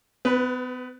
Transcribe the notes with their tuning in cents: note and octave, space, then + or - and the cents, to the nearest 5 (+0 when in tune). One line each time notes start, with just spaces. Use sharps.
B3 +35 B4 +0